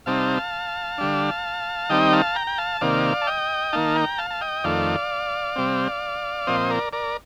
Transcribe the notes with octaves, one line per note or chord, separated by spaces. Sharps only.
C3 G3 C4 D#4 F5 A5
D3 G3 D4
D#3 G3 C4 D#4 D#5 G5
F5 A5
G5 A#5
G5
F5 A5
C3 D#3 A#3 D5 F5
A5
D#5 G5
D#3 A#3 D#4 F5 A5
G5 A#5
F5 A5
A5
D#5 G5
F2 D#3 A3 D5 F5
C3 G3 C4
A#2 F3 C4 C5 D#5
A#4 D5
A#4 D5